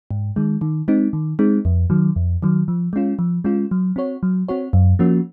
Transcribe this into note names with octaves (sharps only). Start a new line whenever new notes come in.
G#2
D#3 G#3
D#3
G#3 C4 D#4
D#3
G#3 C4 D#4
F2
D#3 F#3
F2
D#3 F#3
F3
G#3 C#4 F4
F3
G#3 C#4 F4
F#3
C4 F#4 C#5
F#3
C4 F#4 C#5
F#2
F3 A#3 C#4 F#4